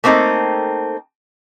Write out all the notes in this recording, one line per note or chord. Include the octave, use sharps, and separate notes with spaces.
A3 A#3 C4 D#4 A4